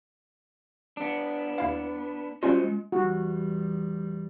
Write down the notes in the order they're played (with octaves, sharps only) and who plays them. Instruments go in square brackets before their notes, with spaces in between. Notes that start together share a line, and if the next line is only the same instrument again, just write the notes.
[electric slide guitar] B3 D4
[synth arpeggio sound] D#2 E4 F5
[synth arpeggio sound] G3 C#4 F4 [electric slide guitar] F#4 C5 D#5
[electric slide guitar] G#3
[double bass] E2 G3 [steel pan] F#4